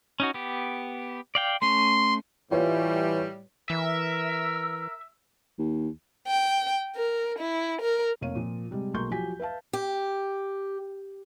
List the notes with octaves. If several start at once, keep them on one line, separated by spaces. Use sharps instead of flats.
C#4 D#4 F#4
B3 G4
D5 F5 G5
A3 C#4 C6
A2 E3 G3 F4 B4 C#5
E3 A#4 E5
D#2
G5
A#4
E4
A#4
F1 A#3 C#5 F5 D#7
A#2 F3
C3 G3 G#3
B1 G#3 A#3 C6 C#6 G6
F3 F#3 G4 G#5 B6
B4 E5 F5 A5
G4